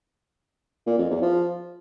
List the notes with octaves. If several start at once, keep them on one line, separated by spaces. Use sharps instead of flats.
A#2
F2
E2
F3